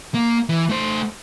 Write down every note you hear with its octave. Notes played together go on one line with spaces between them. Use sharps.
A#3
E3
A3 C5